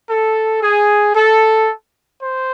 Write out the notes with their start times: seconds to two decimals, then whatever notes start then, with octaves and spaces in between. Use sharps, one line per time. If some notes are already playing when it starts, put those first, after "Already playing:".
0.10 A4
0.62 G#4
1.15 A4
2.20 C5